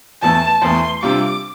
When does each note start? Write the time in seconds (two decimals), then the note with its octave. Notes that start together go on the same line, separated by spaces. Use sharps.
0.22 E2 E3 A3 A5
0.62 E2 E3 A3 C6
1.03 C3 G3 D4 F4 D6